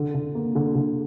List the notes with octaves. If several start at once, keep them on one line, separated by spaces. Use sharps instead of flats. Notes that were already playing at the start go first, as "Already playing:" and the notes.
Already playing: D3
D3
A#3
D3
D3